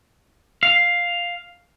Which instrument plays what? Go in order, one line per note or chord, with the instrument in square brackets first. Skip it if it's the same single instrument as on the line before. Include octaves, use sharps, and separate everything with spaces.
[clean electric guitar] F5